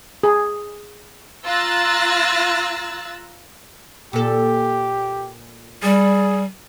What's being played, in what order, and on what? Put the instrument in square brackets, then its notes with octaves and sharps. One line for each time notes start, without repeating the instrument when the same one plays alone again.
[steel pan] G#4
[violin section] F4 A#5 E6 F#6 A6
[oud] A#2 A4 [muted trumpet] G4
[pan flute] G3 [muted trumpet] G#4